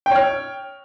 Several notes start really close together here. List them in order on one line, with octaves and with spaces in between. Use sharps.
G5 C#5 F6